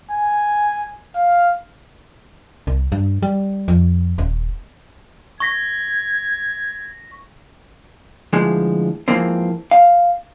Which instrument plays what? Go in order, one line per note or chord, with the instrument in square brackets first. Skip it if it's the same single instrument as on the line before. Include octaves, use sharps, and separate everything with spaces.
[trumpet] G#5
F5
[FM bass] C2
G2
G3
F2
D#1
[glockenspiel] C#6 A#6 B6 [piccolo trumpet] G#6
[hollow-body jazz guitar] D2 E3 F3 G#3
G#2 E3 F3 A#3 C4
F5